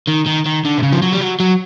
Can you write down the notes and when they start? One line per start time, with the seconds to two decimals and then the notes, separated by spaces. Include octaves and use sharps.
0.08 D#3
0.27 D#3
0.46 D#3
0.65 D3
0.78 C3
0.83 C#3
0.93 F3
1.02 F#3
1.12 G3
1.20 F#3
1.40 F#3